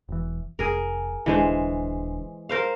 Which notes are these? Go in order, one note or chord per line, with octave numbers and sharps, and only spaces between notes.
E1 E3
F1 G#4 A#4
D#1 D3 E3 G#3 D4 C5
A#4 C5 F5